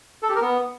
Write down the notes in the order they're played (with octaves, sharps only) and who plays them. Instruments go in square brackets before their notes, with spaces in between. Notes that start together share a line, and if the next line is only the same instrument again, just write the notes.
[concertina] A4
G4
A#4
B3